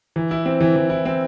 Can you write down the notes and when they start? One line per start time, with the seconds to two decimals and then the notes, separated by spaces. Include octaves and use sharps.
0.16 E3
0.31 E4
0.46 C4
0.61 E3
0.76 E3
0.90 E4
1.05 C4